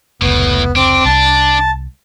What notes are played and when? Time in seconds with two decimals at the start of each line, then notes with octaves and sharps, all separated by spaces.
0.22 F1 C#2 A2 B3
0.76 C4 D4 D6
1.05 C2 A5